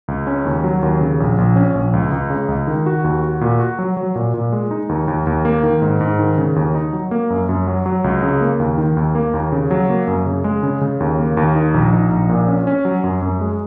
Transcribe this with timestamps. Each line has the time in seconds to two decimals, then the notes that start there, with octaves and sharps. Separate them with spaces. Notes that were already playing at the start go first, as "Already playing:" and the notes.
0.08 C#2
0.27 C#4
0.45 D#2
0.64 F#3
0.83 D#2
1.01 C#3
1.20 A#1
1.38 A#1
1.56 C#4
1.75 A#1
1.93 C#2
2.12 C#2
2.30 C#3
2.49 C#2
2.67 D#3
2.86 F#4
3.04 D#2
3.23 F#4
3.41 A#2
3.60 F#4
3.79 F#3
3.97 F#3
4.15 A#2
4.34 A#2
4.52 G#3
4.71 D#4
4.89 D#2
5.08 D#2
5.27 D#2
5.45 A#3
5.63 D#3
5.82 G#2
6.01 G#2
6.19 D#3
6.38 C#3
6.56 D#2
6.75 D#4
6.93 F#3
7.11 A#3
7.30 F#2
7.49 F#2
7.67 F#3
7.86 F#3
8.04 C#2
8.23 C#3
8.41 A#3
8.60 D#2
8.78 D#3
8.97 D#2
9.15 A#3
9.34 D#2
9.52 C#3
9.71 F#3
9.90 A#3
10.07 F#2
10.26 C#3
10.44 G#3
10.63 C#3
10.81 C#3
11.00 D#2
11.19 A#3
11.37 D#2
11.55 D#4
11.74 A#1
11.93 D#4
12.11 A#1
12.29 A#2
12.48 C#4
12.67 C#4
12.85 F#3
13.04 F#2
13.22 F#2
13.41 G#3